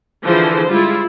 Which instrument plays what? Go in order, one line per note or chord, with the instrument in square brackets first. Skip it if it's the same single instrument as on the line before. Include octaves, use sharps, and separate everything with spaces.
[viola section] D3 E3 F3 E4 G#4 C5
G3 G#3 E4 F4